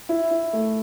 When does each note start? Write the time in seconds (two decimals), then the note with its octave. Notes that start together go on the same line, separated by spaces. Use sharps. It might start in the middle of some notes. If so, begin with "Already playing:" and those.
0.09 E4
0.31 E4
0.53 A3